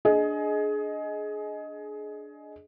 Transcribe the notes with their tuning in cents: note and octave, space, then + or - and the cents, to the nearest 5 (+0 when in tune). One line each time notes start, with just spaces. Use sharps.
D4 +0 G#4 +20 D#5 +5